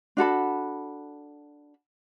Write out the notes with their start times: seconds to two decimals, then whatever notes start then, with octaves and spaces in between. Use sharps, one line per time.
0.17 D4 F#4 A4 B5